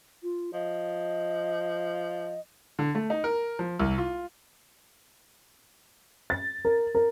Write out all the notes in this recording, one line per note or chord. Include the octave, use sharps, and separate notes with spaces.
F4
F3 D#5
D3
A3
D#4
A#4
F3
C2
F4
A6
A#4
A#4